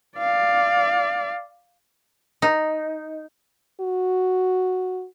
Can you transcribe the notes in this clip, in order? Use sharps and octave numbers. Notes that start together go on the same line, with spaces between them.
D5 F5
D#4
F#4